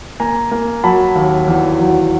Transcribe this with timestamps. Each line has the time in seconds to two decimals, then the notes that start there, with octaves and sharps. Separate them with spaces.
0.20 A#3 G#5 A#5
0.51 A#3
0.84 F#3 A5 B5
1.15 D#2
1.48 E2
1.79 F#3